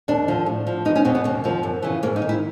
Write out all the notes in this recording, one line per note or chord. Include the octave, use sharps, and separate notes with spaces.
D#2 D4
D3 F3
A2
F3
E2 D#4
C#4
B2 C4
B3
D#2 A#3
D3 F3
F#2
C#3 E3
G#2 A#3
D#4
D#3
E4